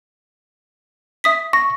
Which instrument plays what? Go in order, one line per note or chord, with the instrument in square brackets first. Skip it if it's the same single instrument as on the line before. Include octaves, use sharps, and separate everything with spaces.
[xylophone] E5 D#6 B6
[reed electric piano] C#6 [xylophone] A#6